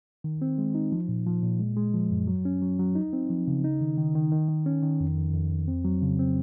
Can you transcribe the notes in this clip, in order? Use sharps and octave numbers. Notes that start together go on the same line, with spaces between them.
D#3
C4
G#3
D#4
F3
A#2
F3
A#2
G#3
G#3
F3
F#2
F#3
C#4
F#3
F#3
D#4
C4
F3
C#3
D#4
D#3
D#3
D#3
D#3
D#3
C#4
D#3
F2
F2
F2
F2
C4
F#3
C#3
C4